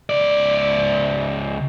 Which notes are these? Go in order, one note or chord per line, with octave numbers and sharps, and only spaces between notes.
C#2 D5